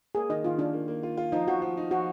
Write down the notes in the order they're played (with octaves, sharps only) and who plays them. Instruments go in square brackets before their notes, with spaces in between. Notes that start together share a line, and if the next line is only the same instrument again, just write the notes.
[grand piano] A#3 [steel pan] G#4
[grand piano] D#3 [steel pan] D#5
[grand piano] D#3 [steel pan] F4
[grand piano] D#3 [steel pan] D4
[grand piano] A#3
A#3
F4
F4
[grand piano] F3 [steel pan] D#4
[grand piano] F3 [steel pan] F#4
[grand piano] F3
D#4
[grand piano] F3 [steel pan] F#4